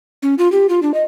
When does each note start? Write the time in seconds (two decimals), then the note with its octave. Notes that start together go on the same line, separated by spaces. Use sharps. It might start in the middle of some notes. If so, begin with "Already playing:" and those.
0.23 C#4
0.38 F4
0.52 G4
0.69 F4
0.82 D4
0.94 D#5